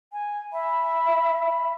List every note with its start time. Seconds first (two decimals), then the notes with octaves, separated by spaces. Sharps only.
0.13 G#5
0.53 E5 B5